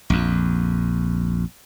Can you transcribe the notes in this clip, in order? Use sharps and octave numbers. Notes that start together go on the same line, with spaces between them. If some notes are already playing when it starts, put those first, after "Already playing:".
A#1 F2